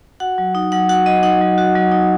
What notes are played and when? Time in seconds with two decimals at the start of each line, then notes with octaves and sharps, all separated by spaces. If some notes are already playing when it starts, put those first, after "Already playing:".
0.20 F#4 F#5
0.38 F#3
0.55 D#4
0.72 F#3 F#5
0.89 F#4 F#5
1.06 F#3 D#5
1.23 D#4 F#5
1.41 F#3
1.58 F#4
1.76 F#3
1.92 D#4